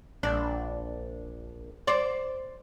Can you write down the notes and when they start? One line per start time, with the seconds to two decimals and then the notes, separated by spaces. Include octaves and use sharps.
0.23 A#1 D4
1.87 C5 D5